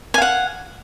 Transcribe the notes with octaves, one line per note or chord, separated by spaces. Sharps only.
F5 F#5 G#5